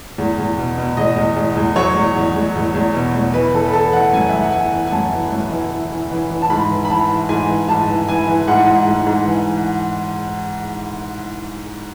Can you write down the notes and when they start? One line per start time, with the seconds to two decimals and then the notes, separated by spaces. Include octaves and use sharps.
0.18 E2
0.38 E2
0.57 B2
0.78 B2
0.97 E2 D#5
1.16 E2
1.36 E2
1.57 E2
1.76 F#3 C#5
1.95 E2
2.16 E2
2.35 E2
2.56 E2
2.75 E2
2.95 B2
3.15 E2
3.34 E3 B4
3.53 E3 A4
3.68 B4
3.73 E3 A4
3.93 E3 F#5
4.13 F#2 G#5
4.29 F#2 E5
4.41 F#5
4.52 E3 G#5
4.73 E3
4.87 G#5
4.92 F#2 A5
5.13 E3
5.32 F#2
5.51 E3
5.71 E3
5.92 E3
6.11 E3
6.30 E3
6.42 A5
6.50 G#2 B5
6.71 E3
6.85 B5
6.90 E3 A5
7.09 E3
7.29 G#2 G#5
7.49 E3
7.69 G#2 A5
7.88 E3
8.08 E3 G#5
8.28 E3
8.48 G#2 F#5
8.67 G#2
8.88 G#2
9.07 G#2
9.26 E3